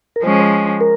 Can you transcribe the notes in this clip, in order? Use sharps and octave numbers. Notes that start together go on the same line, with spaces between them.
A#4
F3 G#3 C#4 C5
A#4